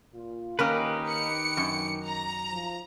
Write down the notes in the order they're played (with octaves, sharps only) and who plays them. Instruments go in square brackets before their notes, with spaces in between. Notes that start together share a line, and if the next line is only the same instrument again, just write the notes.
[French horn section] A#2 F4
[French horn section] D#3 [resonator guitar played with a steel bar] A#3 C#4 A#4 [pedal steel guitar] D#4 G4 B4
[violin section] C#7
[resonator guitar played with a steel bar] F#2
[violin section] A#5
[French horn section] F3